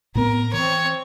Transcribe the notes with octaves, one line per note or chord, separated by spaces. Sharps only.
A2 B3 C4 A#4
E3 C4 C#5